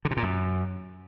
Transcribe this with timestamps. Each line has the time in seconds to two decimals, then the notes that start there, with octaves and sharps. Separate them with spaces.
0.05 D3
0.11 C3
0.17 A#2
0.23 F#2